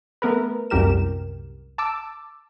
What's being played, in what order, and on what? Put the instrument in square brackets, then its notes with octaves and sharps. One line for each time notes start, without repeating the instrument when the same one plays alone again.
[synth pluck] A3 B3 A#4 B4
C2 F#2 A2 G4 A#4 E7
A5 D6 E6